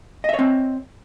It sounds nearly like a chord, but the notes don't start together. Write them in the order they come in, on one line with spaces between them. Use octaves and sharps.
D#5 E5 C#5 C4